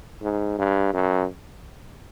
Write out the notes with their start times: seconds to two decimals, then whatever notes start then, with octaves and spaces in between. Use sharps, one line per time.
0.22 G#2
0.59 G2
0.94 F#2